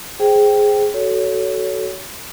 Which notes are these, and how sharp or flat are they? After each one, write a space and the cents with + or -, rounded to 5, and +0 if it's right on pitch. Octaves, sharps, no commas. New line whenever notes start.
G#4 +0 C5 +0 G5 +0
F#4 +25 A4 +0 C#5 +20